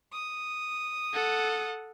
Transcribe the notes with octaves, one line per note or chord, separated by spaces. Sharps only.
D#6
A4 F#5